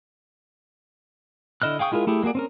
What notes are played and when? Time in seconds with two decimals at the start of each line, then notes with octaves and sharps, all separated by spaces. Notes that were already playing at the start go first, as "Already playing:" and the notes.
1.62 D3 E4 D#5 F6 F#6
1.79 G#4 F5 G5 C#6 D#6
1.92 G#3 E4 F4 G#4 A#4
2.07 A3 E4 G4 G#4
2.23 G#3 A#3 F#4 G#4 D5
2.35 C4 C#4 A#4